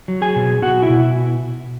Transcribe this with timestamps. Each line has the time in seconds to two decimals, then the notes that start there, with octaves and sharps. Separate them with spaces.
0.08 F#3
0.22 G#4 G#5
0.36 B2
0.62 B2 F#4 F#5
0.82 E4 E5
0.90 B2